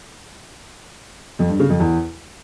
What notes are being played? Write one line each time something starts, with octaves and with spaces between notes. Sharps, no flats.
F2
G2
C#3
F2
E2